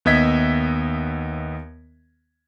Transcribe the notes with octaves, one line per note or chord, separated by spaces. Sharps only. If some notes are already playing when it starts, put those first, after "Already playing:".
D#2 B3 D#5 E5 G#6 B6